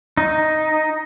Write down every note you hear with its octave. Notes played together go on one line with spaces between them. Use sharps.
D#4